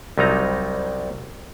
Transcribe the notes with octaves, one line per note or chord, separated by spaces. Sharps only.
C2 C3 F#3 G3 D#4 A#5